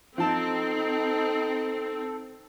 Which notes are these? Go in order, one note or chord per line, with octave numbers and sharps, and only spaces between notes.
F3 C4 D#4 A4 A5